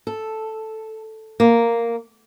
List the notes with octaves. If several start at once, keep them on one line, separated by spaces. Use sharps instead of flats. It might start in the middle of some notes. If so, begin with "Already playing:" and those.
A4
A#3